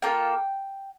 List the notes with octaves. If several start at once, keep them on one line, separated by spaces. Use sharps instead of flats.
A#3 F4 A4 G5